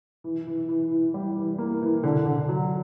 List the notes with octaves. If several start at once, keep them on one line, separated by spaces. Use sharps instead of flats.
E3
E3
E3
E3
G3
E3
A#3
E3
D3
D3
F#3